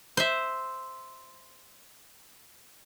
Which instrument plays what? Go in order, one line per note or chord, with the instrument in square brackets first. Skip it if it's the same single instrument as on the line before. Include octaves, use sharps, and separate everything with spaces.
[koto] C5 E5